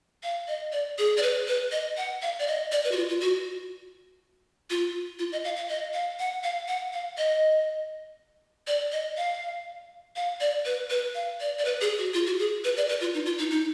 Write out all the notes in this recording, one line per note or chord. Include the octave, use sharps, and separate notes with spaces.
F5
D#5
D5
G#4
D5
B4
B4
D#5
F#5
F5
D5
D#5
D5
B4
F#4
F4
F4
F#4
F4
F4
D#5
F5
F5
D#5
F5
F#5
F5
F#5
F5
D#5
D5
D#5
F5
F5
D5
B4
B4
F5
D5
D5
B4
G#4
F#4
F4
F#4
G#4
B4
D5
B4
F4
D#4
F4
D#4
D#4